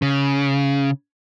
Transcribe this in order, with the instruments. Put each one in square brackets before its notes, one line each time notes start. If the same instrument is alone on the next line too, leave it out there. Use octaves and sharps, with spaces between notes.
[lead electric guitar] C#3